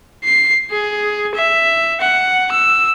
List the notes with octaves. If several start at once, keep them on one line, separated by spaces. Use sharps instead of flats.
C7
G#4
E5
F#5
E6